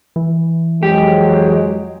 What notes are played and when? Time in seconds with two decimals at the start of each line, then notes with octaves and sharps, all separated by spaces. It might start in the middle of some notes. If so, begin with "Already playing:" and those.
0.16 E3
0.83 F2 F#3 G#3 G4